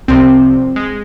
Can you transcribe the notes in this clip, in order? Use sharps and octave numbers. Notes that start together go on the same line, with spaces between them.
C2 C3 F3 C4
G#3